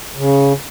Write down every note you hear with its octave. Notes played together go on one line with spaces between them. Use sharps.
C#3